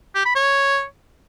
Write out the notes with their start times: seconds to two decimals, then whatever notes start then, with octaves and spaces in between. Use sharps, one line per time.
0.15 G4
0.25 B5
0.35 C#5